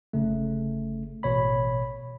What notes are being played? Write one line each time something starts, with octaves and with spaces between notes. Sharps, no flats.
G1 C#3 A3
A1 B2 C#5 B5